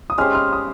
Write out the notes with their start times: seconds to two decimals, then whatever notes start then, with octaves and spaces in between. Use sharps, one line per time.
0.10 D#6
0.18 G#3 C#4 G4 C5 F6
0.35 F6
0.52 D#6